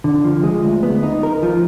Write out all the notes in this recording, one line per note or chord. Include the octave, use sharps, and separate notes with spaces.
D3
F3
G#3
D2
B3
D#4
A#4
F3